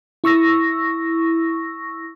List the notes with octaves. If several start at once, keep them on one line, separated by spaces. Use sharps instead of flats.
E4 C#6 E6 A#6